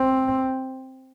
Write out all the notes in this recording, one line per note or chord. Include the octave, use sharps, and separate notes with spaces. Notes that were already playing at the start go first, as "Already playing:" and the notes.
Already playing: C4